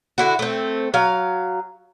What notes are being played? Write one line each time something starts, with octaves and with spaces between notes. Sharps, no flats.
D3 E4 F#4
A3 C4
F#3 F5